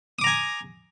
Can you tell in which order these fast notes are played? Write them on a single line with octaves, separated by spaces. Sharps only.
D#6 D6 A#5 G#5